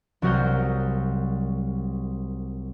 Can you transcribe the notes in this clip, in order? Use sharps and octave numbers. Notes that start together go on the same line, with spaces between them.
C2 F#3 F#4 A#4 D#6 G6